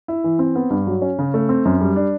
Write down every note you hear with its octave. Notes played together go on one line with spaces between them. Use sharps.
E4
E3
C4
B3
G2
F#3
C#4
C#3
A3
C4
F#2
G3
D4